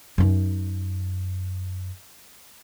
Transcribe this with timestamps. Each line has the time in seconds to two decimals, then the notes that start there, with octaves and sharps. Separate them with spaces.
0.18 F#2 D#4